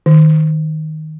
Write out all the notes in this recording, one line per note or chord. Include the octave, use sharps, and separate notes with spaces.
D#3